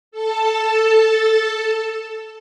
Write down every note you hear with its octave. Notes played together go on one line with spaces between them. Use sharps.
A4 A5